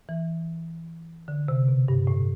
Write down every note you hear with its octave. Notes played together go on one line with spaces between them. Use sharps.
E3
D3
C3
B2
G2
A2